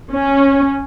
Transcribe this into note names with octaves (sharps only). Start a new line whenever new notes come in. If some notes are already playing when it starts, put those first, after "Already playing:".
C#4